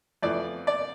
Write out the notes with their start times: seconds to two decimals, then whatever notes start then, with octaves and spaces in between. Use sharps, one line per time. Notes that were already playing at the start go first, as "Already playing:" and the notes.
0.23 F2 E3 A3 D5
0.67 D5